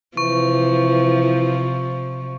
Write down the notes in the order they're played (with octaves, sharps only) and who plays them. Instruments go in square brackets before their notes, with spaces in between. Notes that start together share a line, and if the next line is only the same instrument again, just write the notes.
[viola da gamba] C3 F3 [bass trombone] E3 [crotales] C#6